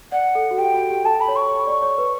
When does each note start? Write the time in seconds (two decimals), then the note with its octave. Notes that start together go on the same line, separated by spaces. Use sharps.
0.12 D5 F#5
0.35 A4
0.51 F#4
0.58 G4 G5
0.74 F#4
0.90 G4
1.05 A4 A5
1.20 B5
1.28 C#5
1.36 C#6
1.67 D5
1.82 C#5
1.98 B4